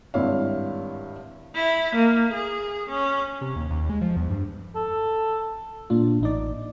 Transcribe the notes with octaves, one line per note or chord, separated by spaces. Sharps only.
G#1 G2 E4 C#5 E5 F5
E4
A#3
G#4
C#4
C3
D#2
D#2
G#3
F3
E2
G2
A4
A#2 D4 F4
A1 D#4 D5